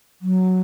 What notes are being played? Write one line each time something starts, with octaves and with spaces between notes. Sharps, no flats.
F#3